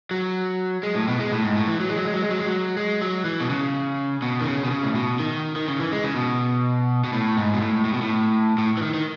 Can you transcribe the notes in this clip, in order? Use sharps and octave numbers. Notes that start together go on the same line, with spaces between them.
F#3
G#3
A2
B2
G#3
A2
G#2
A2
E3
F#3
G#3
F#3
G#3
F#3
G#3
F#3
G#3
F#3
G#3
F#3
E3
B2
C#3
B2
D#3
C#3
B2
C#3
A2
B2
D#3
D#3
C#3
E3
G#3
C#3
B2
B2
A2
G#2
B2
A2
A2
B2
A2
A2
E3
D#3
D#3